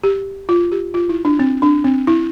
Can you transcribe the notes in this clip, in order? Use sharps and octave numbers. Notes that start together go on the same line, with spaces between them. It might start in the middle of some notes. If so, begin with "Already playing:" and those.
G4
F4
G4
F4
E4
D4
C4
D4
C4
E4